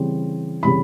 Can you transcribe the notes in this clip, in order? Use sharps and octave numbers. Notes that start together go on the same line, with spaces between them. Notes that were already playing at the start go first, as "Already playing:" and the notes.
Already playing: C#3 E3 G3 C4
C#3 E3 G3 C4 B5